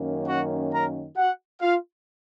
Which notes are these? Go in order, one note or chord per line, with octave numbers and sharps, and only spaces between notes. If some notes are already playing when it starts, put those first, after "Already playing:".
Already playing: F#2 D#3 A#3 C#4
F#4 F#5
A#4 A#5
F#4 F#5
F4 F5